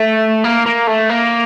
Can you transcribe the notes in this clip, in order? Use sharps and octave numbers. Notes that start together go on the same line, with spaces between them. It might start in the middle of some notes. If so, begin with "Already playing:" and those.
Already playing: A3
A#3
A#3
A3
A#3